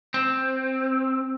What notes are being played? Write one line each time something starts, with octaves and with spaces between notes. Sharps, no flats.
C4